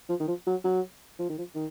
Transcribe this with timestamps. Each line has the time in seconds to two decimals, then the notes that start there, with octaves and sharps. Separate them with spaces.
0.09 F3
0.20 D#3
0.28 F3
0.47 F#3
0.64 F#3
1.19 F3
1.29 D#3
1.38 F3
1.55 D#3